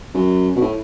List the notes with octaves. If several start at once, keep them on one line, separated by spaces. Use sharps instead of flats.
F#2
B2
A2